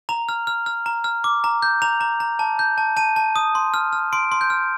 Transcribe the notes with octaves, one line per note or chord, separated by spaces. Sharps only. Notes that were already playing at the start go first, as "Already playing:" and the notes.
A#5 F7
F6
F6
F6
A#5
F6
D6
A#5
G6
A#5 F7
A#5
A#5
A5
G6
A5
A5 D#7
A5
D#6
C6
F6
F6
C6 D7
C6
G6
F6